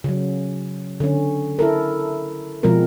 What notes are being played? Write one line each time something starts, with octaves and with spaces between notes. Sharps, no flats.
C#3 F#3
D3 C#4
E4 A4 A#4
B2 F3 G#3 C4 A#4